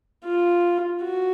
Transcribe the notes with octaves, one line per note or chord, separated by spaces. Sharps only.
F4
F#4